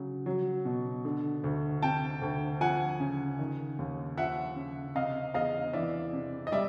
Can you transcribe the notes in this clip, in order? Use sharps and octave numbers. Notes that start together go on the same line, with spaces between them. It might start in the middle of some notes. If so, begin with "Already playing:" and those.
Already playing: C#3 F#3
F#3
B2
D3
D2
C3 G5 A5
D2
F3 F#5 G#5
C#3
D#3
D#2
F3 E5 F#5
C#3
C3 D#5 F5
E2 D#5 F5
E3 D5 E5
C3
D#5
G3 D5 E5